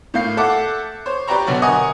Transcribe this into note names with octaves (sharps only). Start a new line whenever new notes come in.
A2 A#3 F5 G6 C7
A4 E5 F#5 D6
C5 C#5
G4 B4 D5 G5 A#5 C#6
B2 D3 F#3 B3 F#4
A#4 D#5 F#5 G#5 C#6 D#6